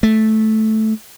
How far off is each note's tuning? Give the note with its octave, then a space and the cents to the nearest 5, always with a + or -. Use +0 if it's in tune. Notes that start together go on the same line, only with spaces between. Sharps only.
A3 -10